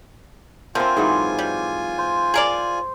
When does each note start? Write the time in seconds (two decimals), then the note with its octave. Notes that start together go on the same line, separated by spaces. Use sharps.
0.75 D3 C4 F4 A#4 C5 E5 G#5 C6
0.97 G#2 E3 F#3 D6
1.39 G3
1.98 C5 C6
2.34 G#4 A#4 D5 C6